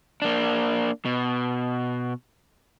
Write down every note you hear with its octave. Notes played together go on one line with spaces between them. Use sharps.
A#3 D4
B2